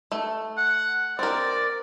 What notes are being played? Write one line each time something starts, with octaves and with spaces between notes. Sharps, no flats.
A3
F#5
C4 A#4 D5